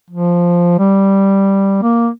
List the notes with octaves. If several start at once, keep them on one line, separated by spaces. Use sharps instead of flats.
F3
G3
A#3